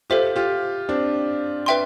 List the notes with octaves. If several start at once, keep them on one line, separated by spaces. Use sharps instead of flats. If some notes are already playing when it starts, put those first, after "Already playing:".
F4 G4 A4 C5 E5
F4 G4
C4 D4
B4 E5 G5 C6